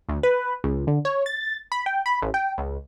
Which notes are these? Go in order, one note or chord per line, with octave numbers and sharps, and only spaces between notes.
D2
B4
C#2
D3
C#5
A6
B5
G5
B5
A1
G5
C#2